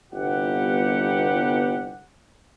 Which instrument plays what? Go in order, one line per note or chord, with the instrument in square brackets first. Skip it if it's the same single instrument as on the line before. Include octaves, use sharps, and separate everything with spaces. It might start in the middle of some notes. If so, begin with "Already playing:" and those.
[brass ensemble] G1 C2 B3 F4 G4 F#5